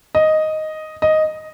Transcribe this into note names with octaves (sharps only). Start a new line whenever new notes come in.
D#5
D#5